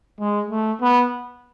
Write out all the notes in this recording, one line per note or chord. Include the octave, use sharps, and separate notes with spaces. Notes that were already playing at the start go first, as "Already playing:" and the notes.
G#3
A3
B3